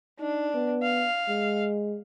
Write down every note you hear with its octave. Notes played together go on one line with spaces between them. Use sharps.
D4 D#4
B3
F5
G#3